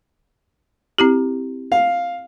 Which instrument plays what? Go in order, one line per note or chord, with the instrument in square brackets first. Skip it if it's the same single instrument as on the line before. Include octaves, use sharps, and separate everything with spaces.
[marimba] C4 E4 G4
[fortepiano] F5